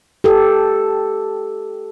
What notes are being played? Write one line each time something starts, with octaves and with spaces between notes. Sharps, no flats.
G4 A4